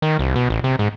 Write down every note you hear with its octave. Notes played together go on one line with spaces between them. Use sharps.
D#3
C2
B2
A1
C3
G#2